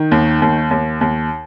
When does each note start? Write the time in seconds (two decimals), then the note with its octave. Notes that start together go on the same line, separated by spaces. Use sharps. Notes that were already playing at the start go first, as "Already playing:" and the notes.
Already playing: D#3
0.11 D#2
0.42 D#2
0.71 D#2
1.01 D#2